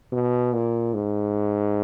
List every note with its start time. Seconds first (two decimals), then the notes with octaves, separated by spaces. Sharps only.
0.12 B2
0.53 A#2
0.94 G#2